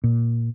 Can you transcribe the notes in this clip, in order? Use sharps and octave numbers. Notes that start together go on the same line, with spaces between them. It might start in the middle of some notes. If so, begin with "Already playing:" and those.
A#2